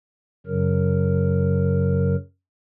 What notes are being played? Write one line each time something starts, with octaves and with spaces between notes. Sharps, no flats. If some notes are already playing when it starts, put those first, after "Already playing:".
F#2 C#3 F#3 A#4